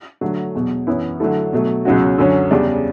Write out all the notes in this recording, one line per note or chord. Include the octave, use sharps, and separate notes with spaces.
D3 F#3 A3
E2 B2 F#3
F#2 E3 B3 E4
D3 F#3 A3 E4 A4
B2 F#3 A3
C#2 B2 F#3 C#4 F#4
F#2 D3 F#3 C#4
E2 C#3 G3 D4